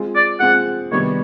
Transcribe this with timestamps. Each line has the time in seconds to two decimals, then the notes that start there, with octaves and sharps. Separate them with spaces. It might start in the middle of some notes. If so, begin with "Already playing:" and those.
Already playing: G#3 C4 F4 G#4
0.15 D5
0.40 G#3 C4 F4 G#4 F#5
0.92 C3 D#3 G3 B3 D4 C#5